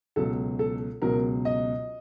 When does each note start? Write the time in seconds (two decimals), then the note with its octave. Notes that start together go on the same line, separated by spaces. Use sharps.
0.16 C#2 B2 F#3 A4
0.59 A4
1.02 C#2 B2 F#3 A#4
1.45 D#5